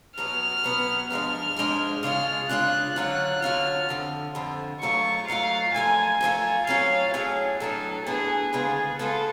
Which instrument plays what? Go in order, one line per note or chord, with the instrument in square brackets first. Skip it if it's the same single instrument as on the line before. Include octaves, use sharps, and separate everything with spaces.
[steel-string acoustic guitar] B2 F#3 B3 [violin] F6
[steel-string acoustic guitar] B2 F#3 B3
[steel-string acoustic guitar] G#2 F3 G#3 D4 [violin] F6
[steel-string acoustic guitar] G#2 F3 G#3 D4
[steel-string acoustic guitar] C#3 G#3 D4 F4 [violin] F6
[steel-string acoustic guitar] C#3 G#3 D4 F4 [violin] F#6
[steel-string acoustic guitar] D3 F#3 C#4 F4 [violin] F#6
[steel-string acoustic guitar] D3 F#3 C#4 F4 [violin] F6
[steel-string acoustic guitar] F2 D3 F3
F2 D3 F3
[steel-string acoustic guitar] G#2 F#3 A3 F4 [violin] C#6
[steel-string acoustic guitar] G#2 F#3 A3 F4 [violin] F5
[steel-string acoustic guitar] F#2 F3 A3 F4 [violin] G#5
[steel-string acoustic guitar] F#2 F3 A3 F4 [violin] G#5
[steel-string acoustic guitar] A2 F#3 C#4 F4 [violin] F5
[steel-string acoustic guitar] A2 F#3 C#4 F4 [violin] G#4
[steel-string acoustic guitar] A2 F#3 B3 D4 [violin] A4
[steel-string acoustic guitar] A2 F#3 B3 D4 [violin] G#4
[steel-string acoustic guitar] D2 C#3 G#3 B3 F4 [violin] G#4
[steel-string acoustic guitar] D2 C#3 G#3 B3 F4 [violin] A4